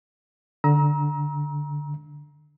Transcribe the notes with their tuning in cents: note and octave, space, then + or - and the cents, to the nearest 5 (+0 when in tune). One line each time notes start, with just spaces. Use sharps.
D3 +0 A#5 +25 E6 -30